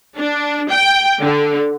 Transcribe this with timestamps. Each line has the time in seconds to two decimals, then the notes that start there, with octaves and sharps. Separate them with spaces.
0.17 D4
0.70 G5
1.21 D3